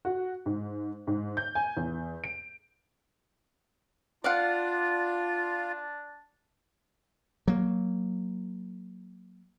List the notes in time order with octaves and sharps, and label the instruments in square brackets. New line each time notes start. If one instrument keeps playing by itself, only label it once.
[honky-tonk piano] F#4
G#2
G#2
G6
G#5
E2
D7
[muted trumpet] D4 [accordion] F4 [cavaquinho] D5 F5 F#5
[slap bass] F#3 A#3